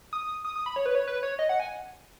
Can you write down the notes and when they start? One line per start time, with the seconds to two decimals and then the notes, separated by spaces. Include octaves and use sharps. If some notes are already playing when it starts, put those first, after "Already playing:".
0.13 D#6
0.45 D#6
0.56 D#6
0.66 B5
0.76 C#5
0.86 B4
0.95 C#5
1.07 B4
1.23 C#5
1.39 D#5
1.49 F#5
1.60 G#5